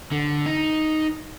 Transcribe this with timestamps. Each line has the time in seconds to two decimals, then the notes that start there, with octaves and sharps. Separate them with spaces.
0.12 D3
0.46 D#4